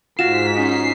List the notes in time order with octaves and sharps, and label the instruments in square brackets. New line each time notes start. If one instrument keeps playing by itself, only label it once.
[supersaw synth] G#2 B6 [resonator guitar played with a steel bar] F4 F#4 [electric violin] C7 [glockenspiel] E7
[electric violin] C#4 D#4 [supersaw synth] C7